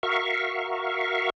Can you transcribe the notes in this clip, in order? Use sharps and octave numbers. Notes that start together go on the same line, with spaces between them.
F#4 A#4 E5 F5 C#6